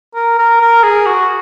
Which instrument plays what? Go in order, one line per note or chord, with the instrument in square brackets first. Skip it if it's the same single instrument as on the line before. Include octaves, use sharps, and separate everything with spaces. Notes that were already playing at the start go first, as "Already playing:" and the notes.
[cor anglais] A#4
A#4
A#4
G#4
F#4